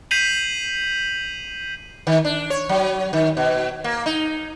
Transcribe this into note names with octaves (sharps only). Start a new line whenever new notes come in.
G6 B6 C7 D#7 F7 F#7
D#3
D4
C#5
F#3
D#3
B2
A#3
D#4